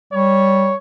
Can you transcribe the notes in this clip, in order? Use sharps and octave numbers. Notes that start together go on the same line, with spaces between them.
G3 C#5